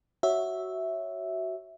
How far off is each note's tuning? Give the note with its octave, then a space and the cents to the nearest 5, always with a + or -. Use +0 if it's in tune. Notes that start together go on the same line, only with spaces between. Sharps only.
F#4 +15 C#5 +0 E5 -5